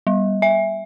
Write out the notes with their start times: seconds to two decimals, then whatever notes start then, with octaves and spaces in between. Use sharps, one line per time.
0.07 G3
0.42 E5